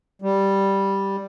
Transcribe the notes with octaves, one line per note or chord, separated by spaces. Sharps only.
G3